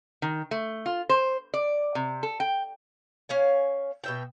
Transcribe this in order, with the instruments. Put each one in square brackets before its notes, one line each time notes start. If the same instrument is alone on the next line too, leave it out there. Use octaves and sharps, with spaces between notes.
[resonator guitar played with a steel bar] D#3
A3
F4
C5
D5
C3
A4
G5
[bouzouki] C#4 F5 G#5
B2 E5 G5